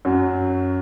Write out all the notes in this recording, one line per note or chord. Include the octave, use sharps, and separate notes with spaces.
F#2 F#3